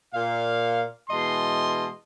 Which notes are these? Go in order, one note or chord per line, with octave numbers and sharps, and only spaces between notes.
A#2 F5
B2 E3 G#3 D#5 A5 C6